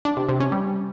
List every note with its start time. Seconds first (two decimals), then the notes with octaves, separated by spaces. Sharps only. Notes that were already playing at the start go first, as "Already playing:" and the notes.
0.05 D4
0.17 C3
0.29 C3
0.40 C#4
0.52 G3